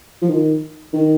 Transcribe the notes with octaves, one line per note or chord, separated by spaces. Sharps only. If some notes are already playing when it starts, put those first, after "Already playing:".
F3
D#3
D#3